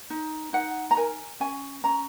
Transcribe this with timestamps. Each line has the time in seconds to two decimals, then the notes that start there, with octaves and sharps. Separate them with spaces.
0.10 D#4
0.53 D#4 F#5
0.91 A#5
0.97 A#4 G#5
1.40 C#4 G#5
1.84 C#4 A#5